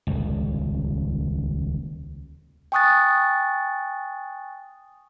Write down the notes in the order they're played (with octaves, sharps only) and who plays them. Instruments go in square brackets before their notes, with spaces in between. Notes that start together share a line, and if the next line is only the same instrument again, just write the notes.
[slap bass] D#1 C#2
[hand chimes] G5 G#5 C#6 D#6 F#6 A6